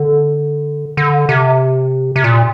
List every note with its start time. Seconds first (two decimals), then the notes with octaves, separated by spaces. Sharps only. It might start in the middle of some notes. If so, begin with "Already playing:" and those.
Already playing: D3
0.97 D3
1.29 C3
2.16 C3
2.24 A#2